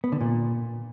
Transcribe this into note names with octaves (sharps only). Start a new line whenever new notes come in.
B3
D3
A#2